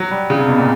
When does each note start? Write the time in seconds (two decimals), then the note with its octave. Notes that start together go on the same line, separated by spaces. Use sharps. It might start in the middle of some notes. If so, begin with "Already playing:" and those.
Already playing: F#3
0.11 G3
0.30 C#3
0.39 C3
0.48 B2
0.58 A#2